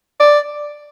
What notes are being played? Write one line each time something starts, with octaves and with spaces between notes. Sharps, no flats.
D5